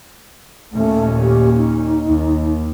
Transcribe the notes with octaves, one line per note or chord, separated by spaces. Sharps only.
D#2 A#2 A3 C#4
G4
D#4
D#2